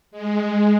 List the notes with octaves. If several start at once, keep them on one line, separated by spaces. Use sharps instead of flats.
G#3